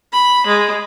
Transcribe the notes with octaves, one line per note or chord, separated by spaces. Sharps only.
B5
G#3